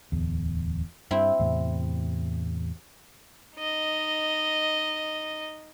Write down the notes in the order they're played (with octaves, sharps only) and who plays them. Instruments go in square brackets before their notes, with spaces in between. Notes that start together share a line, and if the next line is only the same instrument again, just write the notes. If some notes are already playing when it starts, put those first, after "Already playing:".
[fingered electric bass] D1 E2
[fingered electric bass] G2 [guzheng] C4 E4
[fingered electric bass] E2 A2 C3
[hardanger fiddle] D#4 D#5